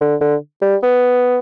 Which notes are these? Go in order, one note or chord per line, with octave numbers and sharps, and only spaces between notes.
D3
D3
G3
B3